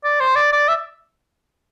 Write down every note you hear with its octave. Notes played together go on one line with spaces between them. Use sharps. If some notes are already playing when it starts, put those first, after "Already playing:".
D5
C5
D5
D5
E5